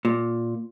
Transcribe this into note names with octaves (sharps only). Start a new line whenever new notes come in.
A#2